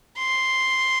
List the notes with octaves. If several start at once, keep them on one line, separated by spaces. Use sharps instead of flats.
C6